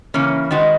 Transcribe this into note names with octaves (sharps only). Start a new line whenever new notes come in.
C#3 E3 A#3 C#4
D#3 G#3 D#4 F#4 B4